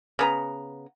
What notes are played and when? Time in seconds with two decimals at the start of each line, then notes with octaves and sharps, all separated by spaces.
0.19 C#3 B3 A#5